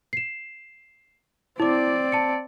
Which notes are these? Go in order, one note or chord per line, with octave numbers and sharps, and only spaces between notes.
C7 E7
C4 E4 D5 D6
A5 C#7